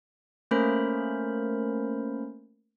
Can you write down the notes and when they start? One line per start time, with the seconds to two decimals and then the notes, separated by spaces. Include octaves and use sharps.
0.51 A3 A#3 C#4 A#4 C5 B5